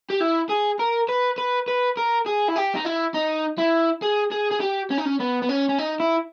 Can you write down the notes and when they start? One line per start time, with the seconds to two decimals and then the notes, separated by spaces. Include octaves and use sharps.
0.10 G4
0.20 E4
0.50 G#4
0.80 A#4
1.09 B4
1.38 B4
1.68 B4
1.97 A#4
2.26 G#4
2.48 E4
2.56 G4
2.75 D#4
2.85 E4
3.14 D#4
3.58 E4
4.02 G#4
4.32 G#4
4.51 G#4
4.61 G4
4.91 C#4
4.98 D#4
5.06 C#4
5.20 B3
5.42 B3
5.49 C#4
5.69 C#4
5.78 D#4
6.00 E4